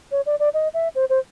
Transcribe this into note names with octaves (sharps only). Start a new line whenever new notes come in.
C#5
D5
D5
D#5
E5
C5
C5